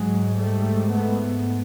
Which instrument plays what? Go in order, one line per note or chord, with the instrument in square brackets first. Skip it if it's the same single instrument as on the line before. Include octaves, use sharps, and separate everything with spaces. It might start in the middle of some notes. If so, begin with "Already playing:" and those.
Already playing: [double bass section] G#2 F#3 G#3
G3 A3
A3 B3